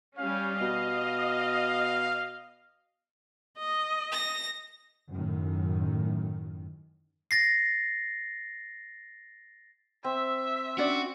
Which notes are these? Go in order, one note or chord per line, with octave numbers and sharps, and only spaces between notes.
G3 C#4 F5
B2 D#5
D#5
A#6
F#2 A2 D#3
A6 A#6 C7
C4 E5
C#4 D4 F#4 D5